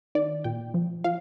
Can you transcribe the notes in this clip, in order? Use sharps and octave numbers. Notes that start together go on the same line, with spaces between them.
D#3 D5
A#2 G5
F3
F3 F5